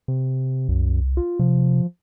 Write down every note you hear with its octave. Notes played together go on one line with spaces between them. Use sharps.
C3
C2 F#2
F4
C3 F3